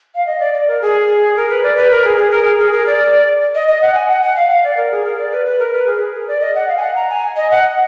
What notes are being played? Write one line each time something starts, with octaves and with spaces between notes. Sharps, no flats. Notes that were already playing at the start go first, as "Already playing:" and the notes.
F5
D#5
D5
D5
A#4
G#4
A#4
B4
D5
B4
A#4
G#4
G#4
A#4
G#4
G#4
A#4
D5
D#5
D#5
F#5
G#5
F#5
F#5
F5
F5
D5
A#4
G#4
A#4
D5
B4
B4
A#4
B4
G#4
A#4
D5
D#5
F#5
F5
G#5
F#5
A#5
G#5
D#5
F#5